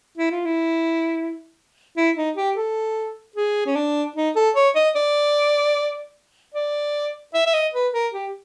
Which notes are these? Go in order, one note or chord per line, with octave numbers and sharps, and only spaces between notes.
E4
F4
E4
E4
D#4
G4
A4
G#4
C#4
D4
D#4
A4
C#5
D#5
D5
D5
E5
E5
D#5
B4
A#4
G4